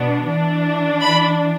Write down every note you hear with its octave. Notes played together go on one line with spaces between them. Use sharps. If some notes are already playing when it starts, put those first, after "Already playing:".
Already playing: B2 B3 D4
E3 D4
B5